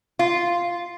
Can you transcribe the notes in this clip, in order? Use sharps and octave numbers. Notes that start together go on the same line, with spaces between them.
F4